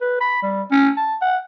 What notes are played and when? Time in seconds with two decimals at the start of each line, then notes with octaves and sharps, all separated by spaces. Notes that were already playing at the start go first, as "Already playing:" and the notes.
0.01 B4
0.21 B5
0.43 G3
0.71 C#4
0.97 A5
1.21 F#5